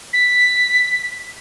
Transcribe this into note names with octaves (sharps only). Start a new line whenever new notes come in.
B6